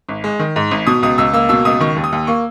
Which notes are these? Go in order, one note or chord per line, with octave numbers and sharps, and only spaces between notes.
G#1
G#3
D#3
G#2
G#1
B2 D#6
C#2 D#6
C#2 E6
A#3 E6
B2 E6
C#2 D#6
D#3 C#6
D#2
D#6
D#2
A#3 C#6